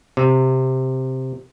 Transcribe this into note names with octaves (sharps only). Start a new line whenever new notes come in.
C3